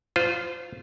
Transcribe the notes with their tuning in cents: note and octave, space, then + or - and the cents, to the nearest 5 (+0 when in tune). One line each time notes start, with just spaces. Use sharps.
F4 +0 C5 -30